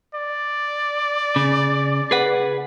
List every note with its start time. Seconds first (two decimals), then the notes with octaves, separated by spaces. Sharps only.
0.15 D5
1.36 C#3
2.11 G#4 B4 F#5